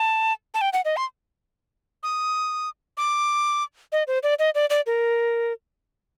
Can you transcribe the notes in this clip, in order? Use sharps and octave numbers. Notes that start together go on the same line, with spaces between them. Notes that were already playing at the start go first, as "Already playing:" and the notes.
Already playing: A5
A5
G5
F#5
D#5
C6
D#6
D6
D#5
C5
D5
D#5
D5
D5
A#4